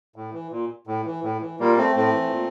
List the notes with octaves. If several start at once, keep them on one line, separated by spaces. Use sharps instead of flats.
A2
E3
A#2
A2
E3
A2
E3
A#2 G3 A#3
A3 C4
A2 A3 C4
E3
A#2